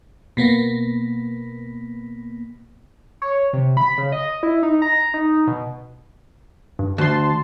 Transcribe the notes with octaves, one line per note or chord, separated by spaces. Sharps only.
B2 A#3 B3
C#5
C3
B5
C#3
D#5
E4
D#4
A#5
D#4
B2
G2
D2 A5 C6